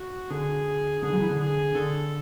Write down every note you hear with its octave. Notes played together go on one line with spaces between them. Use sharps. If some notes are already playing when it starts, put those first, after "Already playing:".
Already playing: F#4
D3 G#4
D3 G#4
F#3
E3
D3
G#4
D3 A4